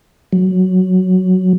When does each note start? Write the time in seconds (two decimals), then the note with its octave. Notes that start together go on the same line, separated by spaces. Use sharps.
0.33 F#3